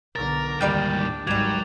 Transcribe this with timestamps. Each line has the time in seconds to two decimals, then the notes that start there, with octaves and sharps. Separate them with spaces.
0.16 B1 D3 A#4 A6
0.61 D2 G#2 D#3 G3 A#3 D5 G6
0.97 D4
1.27 G#1 C#2 G#2 F#3 G3 D6 G#6 F7